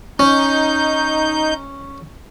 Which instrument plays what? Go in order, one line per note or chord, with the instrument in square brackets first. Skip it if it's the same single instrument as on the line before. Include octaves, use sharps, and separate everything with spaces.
[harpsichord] C#4 [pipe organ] D#4 G6